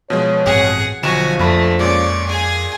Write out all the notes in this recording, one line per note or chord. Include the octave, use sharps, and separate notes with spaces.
B2 F3 G#3 C#5
A1 G2 C4 G#4 F#5
B1 D3 F3 F#4 G#5 E7
A#1 F2 A3 B5
A#2 G#3 C#4 D5
G#4 G#5